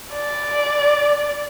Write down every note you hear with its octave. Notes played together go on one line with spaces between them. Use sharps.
D5